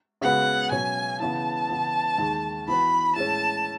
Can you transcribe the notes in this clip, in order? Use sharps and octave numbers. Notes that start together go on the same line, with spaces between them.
C#3 G#3 B3 F#4 B4 F#5
B2 F#3 C#4 G#5
C#3 E3 B3 E4 A5
C#3 E3 B3
D#2 D#3 G#3
E3 B3 F#4 B4 B5
A2 G#3 C#4 A5